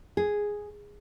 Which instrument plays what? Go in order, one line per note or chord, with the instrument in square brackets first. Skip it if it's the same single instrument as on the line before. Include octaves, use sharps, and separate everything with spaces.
[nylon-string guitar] G#4